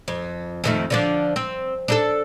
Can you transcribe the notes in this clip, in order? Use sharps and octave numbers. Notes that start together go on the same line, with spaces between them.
F2
F2 D#3 A3
D3 F3 D4
C4
D4 D#4 A4